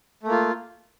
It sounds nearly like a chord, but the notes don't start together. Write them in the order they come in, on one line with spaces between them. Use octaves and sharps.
A3 A#3 F4